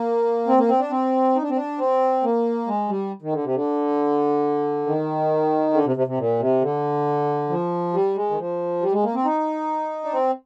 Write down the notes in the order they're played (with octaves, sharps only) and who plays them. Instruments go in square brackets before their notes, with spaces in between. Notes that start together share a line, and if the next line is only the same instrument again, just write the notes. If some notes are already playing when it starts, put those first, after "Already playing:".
Already playing: [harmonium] A#3
C4
A#3
C4
D4
C4
D#4
D4
C4
D4
C4
A#3
G#3
G3
D#3
D3
C3
D3
D#3
D3
C3
C3
C3
A#2
C3
D3
F3
G3
G#3
D#3
F3
G3
G#3
A#3
C4
D#4
D4
C4